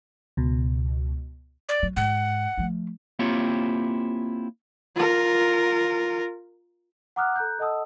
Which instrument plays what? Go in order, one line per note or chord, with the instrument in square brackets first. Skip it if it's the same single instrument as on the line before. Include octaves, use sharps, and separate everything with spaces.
[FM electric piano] C#2 B2
[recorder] D5
[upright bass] F#3
[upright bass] G#2 [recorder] F#5
[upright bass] F3 A3
[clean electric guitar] A#3 C4 E4 F4 G4 C#5
[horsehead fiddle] F4 A#4
[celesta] F#5 A#5 D6 D#6 F6 F#6
A4 A#5 F#6 G6
A4 D#5 F#5 A5 D#6 E6